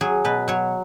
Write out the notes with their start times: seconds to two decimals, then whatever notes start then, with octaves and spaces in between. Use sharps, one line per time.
0.01 F#3 G#4
0.25 B2 B4
0.48 F#3 C#5